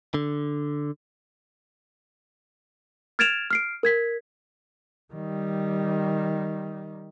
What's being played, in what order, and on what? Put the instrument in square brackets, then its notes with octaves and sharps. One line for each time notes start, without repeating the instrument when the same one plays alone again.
[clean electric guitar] D3
[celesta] F6 G#6 A6 D7 E7 F7
F6 C7 D7
A#4 G#6 B6
[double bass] D#3 G3